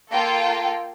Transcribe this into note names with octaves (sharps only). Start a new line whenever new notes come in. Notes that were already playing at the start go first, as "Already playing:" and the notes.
A#3 F4 A4 F5 G5